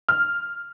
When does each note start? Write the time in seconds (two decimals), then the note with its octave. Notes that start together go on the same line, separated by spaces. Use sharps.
0.08 F6